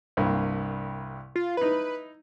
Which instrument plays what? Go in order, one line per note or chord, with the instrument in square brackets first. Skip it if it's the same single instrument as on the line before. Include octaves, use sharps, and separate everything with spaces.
[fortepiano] C2 G2 A#3
[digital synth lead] F4
[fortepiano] D#4 E4 [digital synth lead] B4